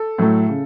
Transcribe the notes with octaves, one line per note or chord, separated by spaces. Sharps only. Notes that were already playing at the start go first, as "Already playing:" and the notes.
Already playing: A4
A2 F#3 A3
C#3